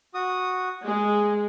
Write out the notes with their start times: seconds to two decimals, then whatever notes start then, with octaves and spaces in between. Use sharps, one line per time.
0.14 F#4 D#6
0.86 G#3 G#4